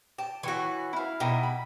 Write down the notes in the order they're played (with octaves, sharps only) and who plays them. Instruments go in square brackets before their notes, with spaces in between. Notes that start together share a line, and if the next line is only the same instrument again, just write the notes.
[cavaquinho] G4 [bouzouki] A5
[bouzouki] E3 F#4 [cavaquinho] C#5 C#6
[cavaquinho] E4 F5
[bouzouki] B2 [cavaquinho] D#4 E4 G4
[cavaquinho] B5